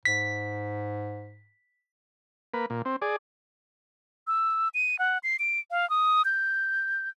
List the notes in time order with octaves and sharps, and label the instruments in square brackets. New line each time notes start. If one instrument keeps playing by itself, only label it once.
[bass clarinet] G#2 [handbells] B6
[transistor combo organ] A#3 B4
A#2
C4
G#4 D5
[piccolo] E6
D#7
F#5
C7
D7
F5
D#6
G6